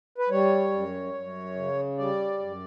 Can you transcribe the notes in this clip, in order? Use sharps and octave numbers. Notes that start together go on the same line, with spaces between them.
B4
G3 C#5
F#2
F#2
C#3
G3 D5
F#2